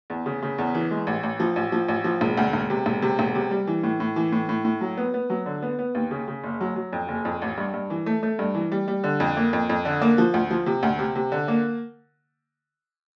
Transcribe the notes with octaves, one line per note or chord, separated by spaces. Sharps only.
E2
C#3
C#3
E2
E3
G#3
A1
A1
F3
A1
F3
A1
F3
E1
D2
E1
C3
E1
C3
E1
C3
G3
E3
A2
A2
E3
A2
A2
A2
F#3
B3
B3
F#3
D3
B3
B3
D#2
C#3
C#3
F#1
F#3
F#3
F2
F#1
F2
A1
G2
G2
E3
A3
A3
G2
E3
G3
G3
D3
F2
A#3
F2
F2
D3
A#3
F3
D2
F3
C3
D2
C3
C3
D3
A#3